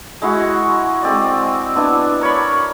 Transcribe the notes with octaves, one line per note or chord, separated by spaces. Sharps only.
G#3 E4 F#4
G#3 C4 D5
B3 D4 E4
A#4 C#5 D5 B5